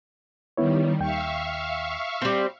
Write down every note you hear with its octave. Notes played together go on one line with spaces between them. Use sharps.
D#3 G3 B3 E4 C#5
D#2 E5 F5 G5 C#6
G3 C4